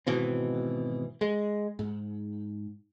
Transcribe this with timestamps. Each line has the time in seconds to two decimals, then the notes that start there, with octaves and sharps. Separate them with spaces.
0.07 G#1 B2 E3 C4
1.21 G#3
1.79 G#2